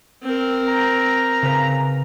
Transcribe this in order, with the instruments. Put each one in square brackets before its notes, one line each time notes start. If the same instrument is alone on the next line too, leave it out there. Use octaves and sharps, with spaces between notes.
[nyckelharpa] C4 A#4
[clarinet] A#5
[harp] C#3 A#4 B4